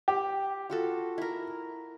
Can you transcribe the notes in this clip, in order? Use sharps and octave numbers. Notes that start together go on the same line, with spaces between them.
G4
F4 F#4 A4
E4 A#4